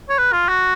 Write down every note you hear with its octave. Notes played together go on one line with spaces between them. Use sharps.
C#5
B4
F4
F#4